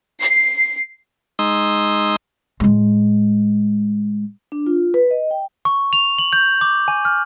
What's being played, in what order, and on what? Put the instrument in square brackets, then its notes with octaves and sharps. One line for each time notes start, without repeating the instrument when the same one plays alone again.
[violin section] C7
[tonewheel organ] G#3 D#4 C6 D#6 E6
[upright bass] A2 G#3
[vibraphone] D4
F4
B4
D#5
G5
[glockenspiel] C#6
F7
F#7
G6
D6
G#5
F6